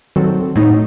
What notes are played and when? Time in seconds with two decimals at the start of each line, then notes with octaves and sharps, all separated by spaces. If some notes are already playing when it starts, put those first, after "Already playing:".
0.16 D#3 F#3 C4 F#4 A4
0.56 A2 F#3 A3 D#4